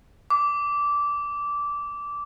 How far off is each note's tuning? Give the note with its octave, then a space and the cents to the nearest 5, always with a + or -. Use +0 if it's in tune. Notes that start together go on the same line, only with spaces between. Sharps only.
D6 -15